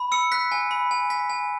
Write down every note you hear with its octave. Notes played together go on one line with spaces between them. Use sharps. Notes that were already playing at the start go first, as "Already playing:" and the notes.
Already playing: B5
E6 C#7
F#6 B6
G#5
B5
G#5
G#5 B6
G#5